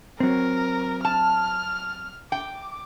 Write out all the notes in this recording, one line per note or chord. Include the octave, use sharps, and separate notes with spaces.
F#3 C4 A#4
A5 F6
G5 D6